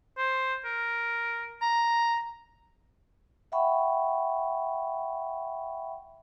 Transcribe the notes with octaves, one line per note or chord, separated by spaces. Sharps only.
C5
A#4
A#5
E5 F#5 G5 B5 C#6